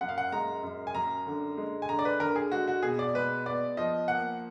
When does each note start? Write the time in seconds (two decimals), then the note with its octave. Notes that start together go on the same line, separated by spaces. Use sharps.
0.01 F#2 F#5
0.09 F5
0.18 F#5
0.32 G#3 A#5
0.63 F#2
0.87 G#5
0.95 F#2 A#5
1.27 D3
1.57 G#3
1.82 G#5
1.89 D3 A#5
1.99 D5
2.05 B4
2.20 D3 A#4
2.36 G#4
2.52 G#3 F#4
2.67 F#4
2.83 B2 G#4
2.99 D5
3.14 G#3 B4
3.45 B3 D5
3.77 F3 D#5
4.08 A#3 F#5